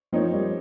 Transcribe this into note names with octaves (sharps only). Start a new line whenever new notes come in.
F3 C4 D#4 A#4 C#5
G3